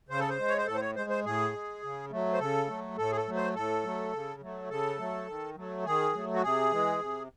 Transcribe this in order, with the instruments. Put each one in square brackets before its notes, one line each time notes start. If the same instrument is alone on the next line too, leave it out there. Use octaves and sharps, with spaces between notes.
[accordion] C#3 C5
A4
C5
G#3
C#5
C5
A2 A4
C5
C#5
G#3 C5
C5
A2 G#4
G#3
C#3
F#3 A3
C5
C#3 A4
F#3 A3
A2 A4
G#4
A4
F#3 A3
C5
A2 A4
F#3 A3
C#3
F#3 A3
C#3 A4
F#3 A3
D#3
F#3 A3
D#3 G#4
F#3 A3
F#4
C3 G#4
E3 G#3
C3